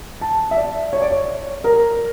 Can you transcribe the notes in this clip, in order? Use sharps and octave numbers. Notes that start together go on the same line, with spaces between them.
A5
E5
D5
C#5
D5
C#5
A#4